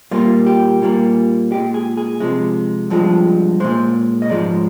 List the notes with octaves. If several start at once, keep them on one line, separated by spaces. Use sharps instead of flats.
A#2 G3 A#3 F4
G4
A#2 G3 A#3
A#2 G#3 G4
G#4
G#4
C3 F3 G#3
G2 F3 G#3
A#2 G#3 C5
D#5
G#2 F3 G#3 D5